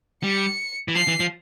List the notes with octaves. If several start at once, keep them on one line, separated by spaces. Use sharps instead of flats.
G3 C#7
E3
F3 C7
E3
F3